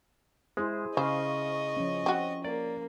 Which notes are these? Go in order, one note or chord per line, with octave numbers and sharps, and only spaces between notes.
G#3 E4 G#4 C5
C#3 C5 D#5 F5 C#6
F3 C#4
C4 F#4
A#3 D5